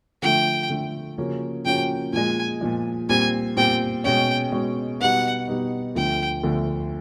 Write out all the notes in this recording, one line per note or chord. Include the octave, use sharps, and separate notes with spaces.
D3 F3 A3 G5
D3 F3 A3
C#3 F3 A#3 C#4 F#4
C#3 F3 A#3 C#4 F#4 G5
A#2 F3 G#3 G#5
A#2 F3 G#3
A#2 G3 C4 G#5
A#2 G3 C4 G5
B2 G#3 C#4 G5
B2 G#3 C#4
B2 G3 B3 D#4 F#5
B2 G3 B3 D#4
D2 D3 F3 A3 G5
D2 D3 F3 A3